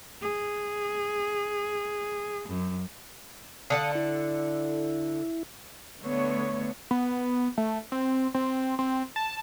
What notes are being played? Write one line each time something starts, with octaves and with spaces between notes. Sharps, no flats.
G#4
F#2
D3 A4 F5 F#5 A5 D#6
E4
D3 A3 B3 C#5
B3
A3
C4
C4
C4
A5